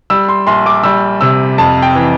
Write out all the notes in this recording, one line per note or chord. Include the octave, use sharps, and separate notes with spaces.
G3 E6
C6
A#1 C6
D6
G3 E6
C3 E6
F2 A5
G5
E3